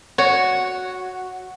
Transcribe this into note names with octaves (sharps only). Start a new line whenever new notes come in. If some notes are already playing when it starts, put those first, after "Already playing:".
F#4 C#5